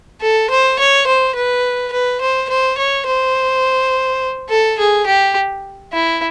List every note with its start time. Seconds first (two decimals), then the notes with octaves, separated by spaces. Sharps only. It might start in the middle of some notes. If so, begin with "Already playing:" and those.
0.22 A4
0.50 C5
0.79 C#5
1.07 C5
1.35 B4
1.93 B4
2.21 C5
2.49 C5
2.79 C#5
3.07 C5
4.50 A4
4.78 G#4
5.06 G4
5.93 E4